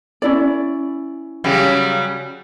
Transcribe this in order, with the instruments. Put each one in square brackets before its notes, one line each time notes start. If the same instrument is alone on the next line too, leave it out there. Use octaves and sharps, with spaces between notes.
[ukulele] C#4 E4 D5
[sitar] C#3 F#3 G3